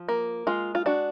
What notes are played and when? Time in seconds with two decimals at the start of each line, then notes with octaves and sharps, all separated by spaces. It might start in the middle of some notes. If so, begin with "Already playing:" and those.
Already playing: F3
0.08 A#3
0.47 G#3 F4
0.75 F4
0.86 D4 F#4